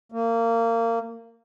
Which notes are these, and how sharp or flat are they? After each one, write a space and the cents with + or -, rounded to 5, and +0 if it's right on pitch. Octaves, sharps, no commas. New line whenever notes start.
A#3 -25